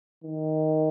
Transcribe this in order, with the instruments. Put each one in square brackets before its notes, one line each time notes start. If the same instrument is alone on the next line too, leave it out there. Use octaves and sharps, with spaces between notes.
[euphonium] D#3